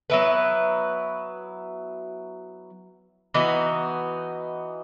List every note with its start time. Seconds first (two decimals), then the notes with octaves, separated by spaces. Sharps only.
0.10 F#3 B3 E4 B4
3.34 E3 B3 D#4 F#4